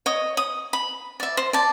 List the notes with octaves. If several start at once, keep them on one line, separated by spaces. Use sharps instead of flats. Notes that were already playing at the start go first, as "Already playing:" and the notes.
C#5 D#5
D#6
B5
D5 E5
C5
D5 A5